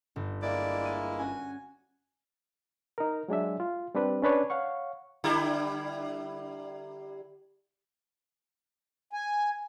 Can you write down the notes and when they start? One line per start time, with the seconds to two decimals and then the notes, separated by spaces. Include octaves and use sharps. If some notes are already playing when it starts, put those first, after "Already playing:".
0.16 G1
0.42 G#3 A#3 E4 D5
0.85 D#7
1.19 C#4 F#4 G#5
2.98 D#4 A#4
3.28 F#3 G#3 D4 E5
3.60 F4
3.95 G3 C4 D4 B4
4.22 C#4 D4 B4 C#5
4.50 C#5 F5 F#5 C#6
5.24 D3 G3 E4
9.13 G#5